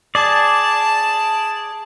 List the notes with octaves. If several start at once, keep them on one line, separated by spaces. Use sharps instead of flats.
G#4 D5 A5